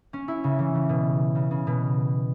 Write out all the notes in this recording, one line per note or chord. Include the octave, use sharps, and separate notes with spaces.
C#4
E4
C#3
E3
C#3
B2
C#3
C#3
B2